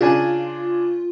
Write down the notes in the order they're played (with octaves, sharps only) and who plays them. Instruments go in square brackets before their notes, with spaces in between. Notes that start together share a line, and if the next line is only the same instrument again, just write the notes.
[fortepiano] C#3 D4 G#5 [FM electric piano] F4